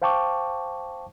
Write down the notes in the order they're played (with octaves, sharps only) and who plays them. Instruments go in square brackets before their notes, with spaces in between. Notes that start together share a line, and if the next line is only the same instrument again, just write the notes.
[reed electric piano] C5 F5 G5 A5 C#6 D6